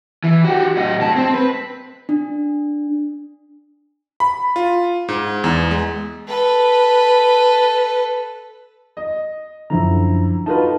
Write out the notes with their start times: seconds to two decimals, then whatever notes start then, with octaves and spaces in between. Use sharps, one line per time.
0.24 E3
0.45 F#4 G4
0.77 A2 D#5
1.00 G2 A5
1.16 C4
1.34 B4
2.09 D4
4.20 B5
4.56 F4
5.08 G#2
5.44 E2
5.71 G#3
6.27 A4 B4
8.97 D#5
9.70 F#2 D3 F3 E4 A#5
10.46 D#4 F4 F#4 A4 B4 A5